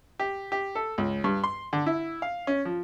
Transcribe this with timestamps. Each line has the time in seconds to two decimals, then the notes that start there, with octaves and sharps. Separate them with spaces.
0.20 G4
0.52 G4
0.75 A4
0.98 C#2
1.24 G2
1.44 C6
1.73 D3
1.86 E4
2.22 F5
2.47 C#4
2.65 F3